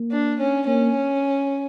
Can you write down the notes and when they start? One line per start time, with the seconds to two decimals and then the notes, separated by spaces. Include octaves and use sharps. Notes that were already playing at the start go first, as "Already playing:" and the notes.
Already playing: A#3
0.11 D4
0.39 C#4
0.67 A#3 C#4